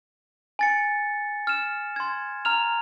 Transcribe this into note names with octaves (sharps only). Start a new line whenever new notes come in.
G#5 A6 C#7
F6 E7
C6 G#6
A#5 F6 F7